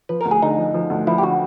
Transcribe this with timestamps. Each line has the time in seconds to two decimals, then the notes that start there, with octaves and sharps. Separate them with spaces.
0.09 F3 B4
0.21 D2 A#4
0.31 G#4
0.42 D3 D#4
0.58 F3
0.74 F3
0.90 D2
1.07 F3 E4
1.18 G4
1.23 D3 F#4